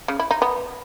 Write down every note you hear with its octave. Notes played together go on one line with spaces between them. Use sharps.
C#3
E4
D#4
B3